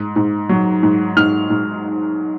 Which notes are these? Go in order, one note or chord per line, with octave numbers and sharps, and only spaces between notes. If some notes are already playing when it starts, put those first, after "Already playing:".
Already playing: G#2
G#2
F#3
G#2
G#2 F6
G#2